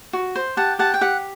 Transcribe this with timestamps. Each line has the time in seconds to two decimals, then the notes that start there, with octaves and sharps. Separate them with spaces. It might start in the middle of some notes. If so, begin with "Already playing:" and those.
0.13 F#4
0.35 C5
0.57 G4 F#5 A5
0.79 G4 F#5 A5
0.94 G5
1.01 G4 F#5